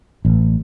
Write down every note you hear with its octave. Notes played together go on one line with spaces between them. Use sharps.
A1